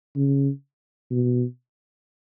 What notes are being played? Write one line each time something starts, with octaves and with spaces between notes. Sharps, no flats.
C#3
B2